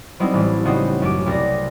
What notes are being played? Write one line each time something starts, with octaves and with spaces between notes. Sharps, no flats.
F#3 G3 B3 C4 D#4 E4
A1 E3 G3
C#3 B3 D#4 F#4 G4 C5
F#2 D6
C2 A#6